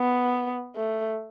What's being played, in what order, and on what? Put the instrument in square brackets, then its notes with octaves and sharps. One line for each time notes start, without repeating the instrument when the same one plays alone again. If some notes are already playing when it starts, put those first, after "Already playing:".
Already playing: [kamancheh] B3
A3